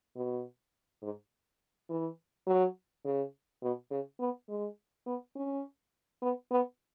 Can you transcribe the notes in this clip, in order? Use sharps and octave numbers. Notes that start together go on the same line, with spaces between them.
B2
G#2
E3
F#3
C#3
B2
C#3
B3
G#3
B3
C#4
B3
B3